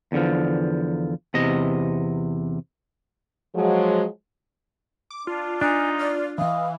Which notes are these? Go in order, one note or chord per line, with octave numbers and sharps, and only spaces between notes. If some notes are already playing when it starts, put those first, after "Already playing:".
E2 D3 F3
E2 C3 D#5
F3 F#3 G#3
D6
D4 F4
D4 D#4 G#5
D5
E3 D#5 F5